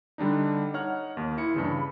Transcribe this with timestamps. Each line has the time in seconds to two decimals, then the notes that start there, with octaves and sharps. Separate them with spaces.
0.18 D3 G3 D4 D#4
0.74 D#4 C#5 F#5 F6
1.17 D#2
1.38 E4 C#7
1.54 G2 C#3 E3
1.77 B5